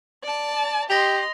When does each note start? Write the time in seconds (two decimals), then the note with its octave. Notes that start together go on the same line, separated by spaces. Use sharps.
0.23 D5 A5
0.90 G4 D#5 C6 A#6 F7